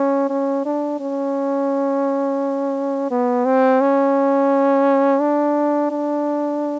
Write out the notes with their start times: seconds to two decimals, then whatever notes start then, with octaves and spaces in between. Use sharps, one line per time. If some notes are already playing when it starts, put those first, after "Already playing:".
Already playing: C#4
0.30 C#4
0.65 D4
1.00 C#4
3.11 B3
3.45 C4
3.81 C#4
5.21 D4
5.91 D4